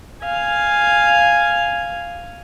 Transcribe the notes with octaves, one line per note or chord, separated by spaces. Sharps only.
F5 G#5